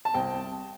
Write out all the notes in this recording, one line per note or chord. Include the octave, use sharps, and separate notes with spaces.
A5
C2 G5